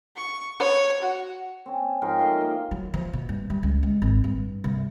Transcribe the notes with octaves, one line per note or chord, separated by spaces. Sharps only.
C#6
C#5
F#4
C4 C#4
G#2 F3 A#4 G5
A3 D#5 F5 C6
A#3
F#3
F3
B2
G2
G3
C#2
G#3
G#1
G2
C2